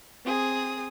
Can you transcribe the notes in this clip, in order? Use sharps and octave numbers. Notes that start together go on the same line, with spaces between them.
C4 G#4 D#6